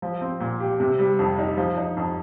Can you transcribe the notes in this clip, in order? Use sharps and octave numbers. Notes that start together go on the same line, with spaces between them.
F3
C4
A#2
G4
C3
G3
F2
D#4
F3
D#4
F2